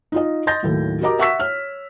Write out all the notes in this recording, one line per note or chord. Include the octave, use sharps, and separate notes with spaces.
D#4 F4 D#5
D#5 C6 G6 A6 A#6
D#2 A2 F#3
F#4 G4 A#4 D#5 A#5 D6
E5 F#5 C#6 E6 B6
C#5 F6